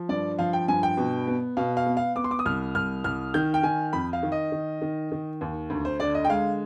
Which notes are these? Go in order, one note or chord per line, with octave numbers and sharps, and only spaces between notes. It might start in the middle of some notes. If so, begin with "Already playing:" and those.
Already playing: F3
G2 D5
F3 F5
G5
G2 G#5
G5
B2
B3
B2 F5
F5
B3
F5
B3 D6
C6
D6
D#6
C2 F6
C2 F6
C2 F6
D#3 G6
G5
D#3 G#5
F2 B5
F5
D#3
D#5
D#3
D#3
D#3
D#2
D2
C5
D3 D5
D#5
G5
G#3 F5